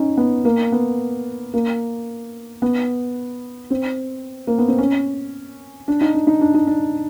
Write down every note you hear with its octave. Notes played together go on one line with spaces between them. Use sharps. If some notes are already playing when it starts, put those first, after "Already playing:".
Already playing: C#4 D#4
B3
A#3
B3
A#3
B3
C4
A#3
B3
C4
C#4
D4
D#4
D4
D#4
D4
D#4
D4